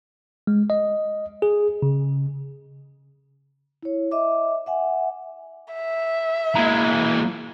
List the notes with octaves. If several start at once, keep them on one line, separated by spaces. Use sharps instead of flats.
G#3
D#5
G#4
C#3
E4 C#5
D#5 E5 D6
E5 F#5 G#5
E5
E3 G#3 A#3 A#5